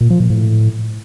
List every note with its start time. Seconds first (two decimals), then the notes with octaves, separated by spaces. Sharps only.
0.01 A#2
0.10 F3
0.20 A#2
0.30 A2